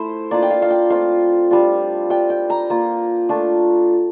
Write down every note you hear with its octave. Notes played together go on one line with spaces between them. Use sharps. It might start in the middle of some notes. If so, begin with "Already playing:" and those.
Already playing: A3 E4 C5
A#3 D4 F4 D5
G5
F5
F5
G5
A3 C4 F4 F5
G3 D4 F4
G3 D4 F4 G5
G5
A#5
A#3 F4
A3 D4 F4